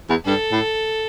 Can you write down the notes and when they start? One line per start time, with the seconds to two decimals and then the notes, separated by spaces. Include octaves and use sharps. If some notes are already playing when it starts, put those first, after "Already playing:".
0.09 E2
0.25 G2 A4
0.52 A2